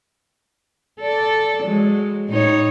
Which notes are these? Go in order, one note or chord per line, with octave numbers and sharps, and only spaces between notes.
A4 D5
F#3 G#3
A2 D#4 C#5